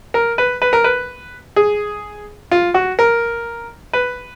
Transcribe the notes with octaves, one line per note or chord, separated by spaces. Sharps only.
A#4
B4
B4
A#4
B4
G#4
F4
F#4
A#4
B4